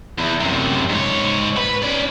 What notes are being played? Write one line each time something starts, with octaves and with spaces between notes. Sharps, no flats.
E2
F#2 C3
G#2 C#5
B4
C#4 D5